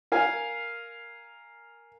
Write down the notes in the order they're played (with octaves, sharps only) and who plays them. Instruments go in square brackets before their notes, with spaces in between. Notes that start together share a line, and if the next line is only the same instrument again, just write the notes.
[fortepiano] A#4 F5 G#5